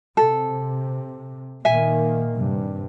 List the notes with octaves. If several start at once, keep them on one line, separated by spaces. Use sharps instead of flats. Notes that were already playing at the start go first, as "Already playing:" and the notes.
C3 A4
A#2 D#3 A#3 E5 G#5
G2 C3